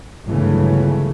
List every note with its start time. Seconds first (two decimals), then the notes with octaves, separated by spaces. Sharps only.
0.27 G1 C#2 C#3 E3 F#3 A3